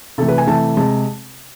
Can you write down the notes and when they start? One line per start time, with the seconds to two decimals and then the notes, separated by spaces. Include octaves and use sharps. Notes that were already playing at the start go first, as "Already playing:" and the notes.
0.18 C3 E3 A3 A4
0.28 B4
0.38 G#5
0.47 C3 E3 A3 A5
0.77 C3 G#3 A5